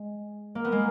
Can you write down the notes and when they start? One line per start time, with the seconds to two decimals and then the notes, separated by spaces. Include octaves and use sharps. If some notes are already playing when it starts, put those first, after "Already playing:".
Already playing: G#3
0.55 A#3
0.65 B3
0.72 G#3 A#3